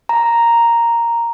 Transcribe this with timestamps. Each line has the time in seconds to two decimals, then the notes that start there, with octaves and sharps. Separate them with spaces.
0.09 A#5